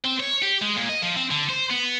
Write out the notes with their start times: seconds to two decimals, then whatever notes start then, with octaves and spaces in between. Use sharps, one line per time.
0.04 C4
0.20 C#5
0.42 G4
0.62 G#3
0.76 A#2
0.89 D#5
1.02 F3
1.16 C4
1.31 D3
1.49 C5
1.70 B3